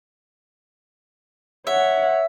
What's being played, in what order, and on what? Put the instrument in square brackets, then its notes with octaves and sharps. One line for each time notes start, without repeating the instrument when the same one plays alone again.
[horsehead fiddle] C#5 F#5 [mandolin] E5